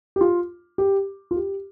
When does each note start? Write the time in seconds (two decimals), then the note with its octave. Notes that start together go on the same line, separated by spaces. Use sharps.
0.16 G4
0.21 F4
0.78 G4
1.31 F4
1.36 G4